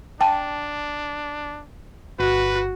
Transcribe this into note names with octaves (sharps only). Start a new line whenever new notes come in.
D4 G5 A5
G1 F#4 B4